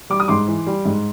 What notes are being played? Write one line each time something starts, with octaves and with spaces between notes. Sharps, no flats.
G3 D6
D#6
G#2 C6 D6
E3
G3
G#2